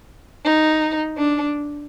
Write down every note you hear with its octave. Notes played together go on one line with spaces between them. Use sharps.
D#4
D4